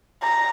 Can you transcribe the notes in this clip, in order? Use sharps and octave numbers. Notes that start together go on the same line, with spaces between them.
A#5